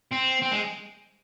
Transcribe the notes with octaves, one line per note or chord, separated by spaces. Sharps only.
C4
C4
G#3